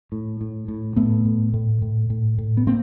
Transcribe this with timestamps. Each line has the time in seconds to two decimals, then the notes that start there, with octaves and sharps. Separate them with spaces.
0.12 A2
0.41 A2
0.68 A2
0.96 A2 A3 B3
1.25 A2
1.54 A2
1.82 A2
2.10 A2
2.38 A2
2.57 B3
2.67 A2 A#3 C4